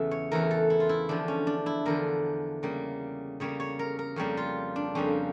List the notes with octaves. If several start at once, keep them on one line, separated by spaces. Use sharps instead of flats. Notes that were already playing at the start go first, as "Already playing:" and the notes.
Already playing: E2 C#3 E3 A3 E5
C#5
E2 C#3 E3 A3 A#4
A4
E4
F4
E4
E2 D3 F3 D4
C#4
D4
E4
E2 D3 F3 A#4
C#3 G3 A#3
C#3 G3 A#3 C#5
C#5
A#4
A#4
F2 C#3 G3 A#3 C#5
F4
D4
F2 C#3 G3 A#3 C#4